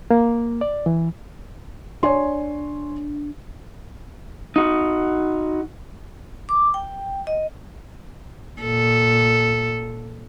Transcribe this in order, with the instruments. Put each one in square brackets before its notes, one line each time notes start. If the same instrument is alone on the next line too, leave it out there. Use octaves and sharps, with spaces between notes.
[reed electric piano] A#3
D5
E3
[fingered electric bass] D4 [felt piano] C#5 G#5 C6
[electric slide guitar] D#4 F#4
[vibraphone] D6
G5
D#5
[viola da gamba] A#2 A4